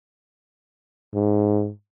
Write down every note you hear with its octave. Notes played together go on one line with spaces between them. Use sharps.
G#2